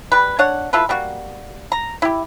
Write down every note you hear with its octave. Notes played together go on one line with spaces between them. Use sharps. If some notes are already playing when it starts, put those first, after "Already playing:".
G3 B4
D4 C#5 F#5
E4 F4 A4 B4
G3 A#3 F#4
A#5
E4 G4